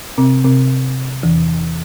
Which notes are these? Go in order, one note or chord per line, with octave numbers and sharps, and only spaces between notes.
C3 C4
C3 C4
E2 E3